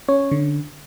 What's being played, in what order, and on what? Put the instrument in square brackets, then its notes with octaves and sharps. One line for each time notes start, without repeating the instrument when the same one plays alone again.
[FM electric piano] C#4 C#5
D3